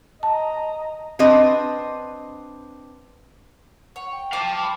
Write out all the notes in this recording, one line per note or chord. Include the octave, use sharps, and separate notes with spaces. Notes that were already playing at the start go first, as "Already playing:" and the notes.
D#5 A5 A#5
C4 D4 B4 D#5
C#5 F#5
G5
F5 A5 D6
B5